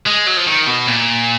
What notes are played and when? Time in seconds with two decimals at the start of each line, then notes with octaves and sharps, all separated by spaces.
0.07 G#3
0.27 F#3
0.37 F3
0.47 D#3
0.68 B2
0.87 A#2